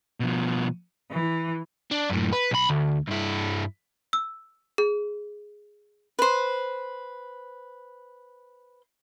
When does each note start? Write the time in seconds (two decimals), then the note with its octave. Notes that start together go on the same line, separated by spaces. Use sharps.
0.20 B2 F3
1.10 E3
1.91 D4
2.09 F#2 A2
2.33 B4
2.51 B1 B5
2.69 D2
3.08 G2 E4
4.13 E6
4.78 G#4
6.19 B4 C5